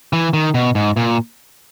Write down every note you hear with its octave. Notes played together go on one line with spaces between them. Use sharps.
E3
D#3
B2
G#2
A#2